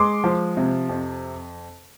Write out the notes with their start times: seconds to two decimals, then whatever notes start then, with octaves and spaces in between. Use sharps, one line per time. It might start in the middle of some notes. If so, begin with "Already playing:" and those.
Already playing: G#3 C6 D6
0.24 F3
0.57 C3
0.89 F2